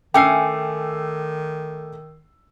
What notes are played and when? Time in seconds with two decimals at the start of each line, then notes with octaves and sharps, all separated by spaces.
0.14 D#3 A3 C#4 G5 G#5 D6 E6 C7